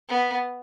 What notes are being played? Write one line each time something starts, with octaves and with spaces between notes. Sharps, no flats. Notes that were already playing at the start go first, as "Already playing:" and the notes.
B3